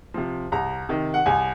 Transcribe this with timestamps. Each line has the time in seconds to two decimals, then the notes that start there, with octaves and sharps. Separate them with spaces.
0.14 C3 F3
0.52 C2 A#5
0.89 C3 D#3
1.14 F#5
1.26 C2 G#5